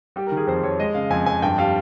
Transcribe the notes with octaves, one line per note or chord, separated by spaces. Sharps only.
G3 G4
A#4
D#3
G#4
F2 C5
F2 C#5
G#3 D#5
C#3 F5
F2 G#5
F2 G#5
G2 G5
G3 F5